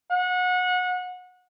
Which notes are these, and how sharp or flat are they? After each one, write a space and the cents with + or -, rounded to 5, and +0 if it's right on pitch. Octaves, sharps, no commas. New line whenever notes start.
F#5 -25